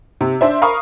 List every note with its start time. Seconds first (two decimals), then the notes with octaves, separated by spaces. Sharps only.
0.21 C3
0.41 D4 C5 E5
0.62 A#4 F5 B5 C#6 D#6